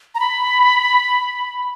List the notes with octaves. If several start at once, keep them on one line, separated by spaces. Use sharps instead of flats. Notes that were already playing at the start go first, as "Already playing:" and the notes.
A#5
B5